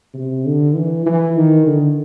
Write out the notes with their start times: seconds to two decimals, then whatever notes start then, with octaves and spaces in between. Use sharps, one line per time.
0.14 C3
0.45 D3
0.75 E3
1.06 E3
1.36 D#3
1.67 D3